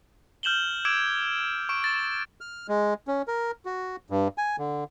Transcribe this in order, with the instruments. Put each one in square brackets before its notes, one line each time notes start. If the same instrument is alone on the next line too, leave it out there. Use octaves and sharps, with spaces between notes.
[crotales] F6 G6 E7 F#7 G7
D6 E6 G#6 D7 E7 F#7
C#6 D7
A6
[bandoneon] F6
G#3
C#4
A#4
F#4
G2
G#5
D3